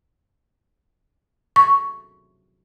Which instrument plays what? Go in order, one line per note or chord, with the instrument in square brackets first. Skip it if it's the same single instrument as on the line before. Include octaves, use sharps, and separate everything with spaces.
[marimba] C#6